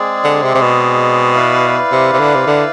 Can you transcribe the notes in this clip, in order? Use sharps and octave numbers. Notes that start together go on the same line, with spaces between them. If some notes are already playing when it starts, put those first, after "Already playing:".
Already playing: G#3 C4 G#4 D5
D3
C3
C3
B2
E4 B4 D5 F5
C3
C3
D3
C3
D3